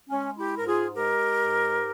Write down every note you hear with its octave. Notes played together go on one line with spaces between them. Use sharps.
G#3 C#4
E4 G4
G#2 A#4
F4 G#4
G#3 G4 A#4
G#2